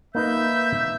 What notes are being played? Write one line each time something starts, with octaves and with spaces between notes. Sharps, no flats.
A#3 D#4 B4 E5 G6